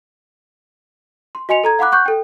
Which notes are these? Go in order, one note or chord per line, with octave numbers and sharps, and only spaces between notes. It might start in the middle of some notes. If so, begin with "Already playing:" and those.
C6
F#4 D#5 G#5 C6 C#7 F7
A4 A#5 G#6
F5 F#5 B5 D6 F#6
F#5 C#6 F#6 G6
A4 G5